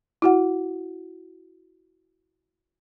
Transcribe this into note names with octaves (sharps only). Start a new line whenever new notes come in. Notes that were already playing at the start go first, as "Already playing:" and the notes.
E4 F#4 F#5